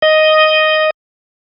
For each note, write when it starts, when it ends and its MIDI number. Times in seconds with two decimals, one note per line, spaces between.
0.02 0.90 75